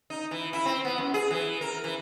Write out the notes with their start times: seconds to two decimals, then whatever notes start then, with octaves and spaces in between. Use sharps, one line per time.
0.10 D#4
0.31 E3
0.53 E4
0.66 C4
0.85 B3
0.98 F#2
1.14 G#4
1.31 E3
1.61 A#4
1.84 E3